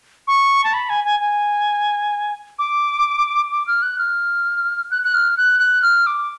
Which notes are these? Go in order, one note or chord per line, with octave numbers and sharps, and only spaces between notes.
C#6
A5
B5
G#5
G#5
G#5
D6
D6
F6
F#6
F6
F#6
F#6
F6
F#6
F#6
F6
D6